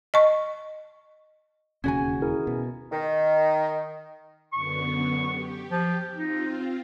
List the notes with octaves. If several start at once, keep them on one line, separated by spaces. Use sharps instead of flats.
D#5 C#6
E1 D#2 C#3 C#4 F#4 G#5 G#6
E4 G#4 A#4
B2
D#3
F#2 D3 B3 C#6
G4
F3
C4 D#4 F4